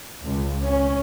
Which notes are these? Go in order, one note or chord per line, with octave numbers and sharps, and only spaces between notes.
C#2
C#4